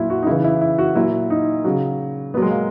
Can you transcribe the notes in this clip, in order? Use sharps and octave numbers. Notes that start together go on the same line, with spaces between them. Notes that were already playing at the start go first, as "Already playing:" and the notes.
Already playing: A#2 F#3 E4
F#4
D#4
C#3 E3 E4
E4
E4
F#4
A#2 F#3 E4
D#4
C#3 F#3
A#2 F#3 B3
G#3
A#3